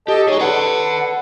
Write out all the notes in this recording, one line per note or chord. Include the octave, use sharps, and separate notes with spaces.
G4 A4 D#5 A5
D#4 G#4 C#5 D#5
A4 B4 D5 F#5